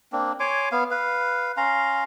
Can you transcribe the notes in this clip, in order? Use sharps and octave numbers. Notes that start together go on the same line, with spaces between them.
A#3 C4 D4
C#5 G#5 C6 D6
B3 F5
B4 F5
C#4 F5 A#5 C6